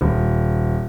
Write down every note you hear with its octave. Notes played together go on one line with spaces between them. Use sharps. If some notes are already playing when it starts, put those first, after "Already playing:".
D#1